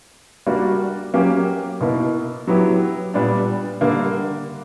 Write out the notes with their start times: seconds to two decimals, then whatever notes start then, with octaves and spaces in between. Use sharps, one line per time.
0.47 G3 A#3 D4 F#4
1.14 F#3 A#3 C#4 G4
1.80 B2 A#3 E4
2.47 F#3 B3 E4 G4
3.14 A#2 G3 B3 D4
3.81 D3 G3 A#3